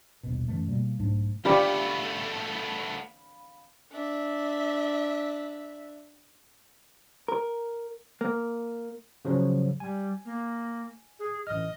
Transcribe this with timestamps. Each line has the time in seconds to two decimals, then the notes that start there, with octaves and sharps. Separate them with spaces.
0.23 D#1 A#1 B2
0.48 F#2 E3 A3
0.67 B2 G3 A3 A#3
0.98 B1 G#2 A3 D4
1.45 A3 B3 F4 G4 D5 F5 B5
3.91 D4 E5
7.28 A#4
8.21 A#3
9.25 C#3 F3 F#3
9.80 G3 G#5
10.25 A#3
11.19 G#4
11.47 A1 D#5 F6